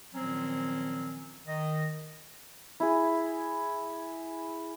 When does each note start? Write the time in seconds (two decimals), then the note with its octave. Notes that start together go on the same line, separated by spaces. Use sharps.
0.14 A#2 D#3 F3 F#3 C4 C#4
1.46 D#3 D#5
2.80 E4 G#4